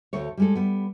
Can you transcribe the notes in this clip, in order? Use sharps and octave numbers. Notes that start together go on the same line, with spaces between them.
D2 A4 C#5
G3 G#3 A4
G3 B3